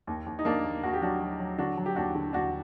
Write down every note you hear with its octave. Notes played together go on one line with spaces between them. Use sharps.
D#2
D#2
D#4
D#2 A#3 D4
D#2
D#2 F#4
G4
F#3 D4 F#4
F#3
F#3
D3 D4 F#4
F#3
G4
D#2 D4 F#4
D3
D#2 D4 F#4